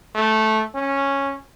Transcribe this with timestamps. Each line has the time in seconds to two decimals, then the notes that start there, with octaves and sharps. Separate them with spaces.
0.15 A3
0.75 C#4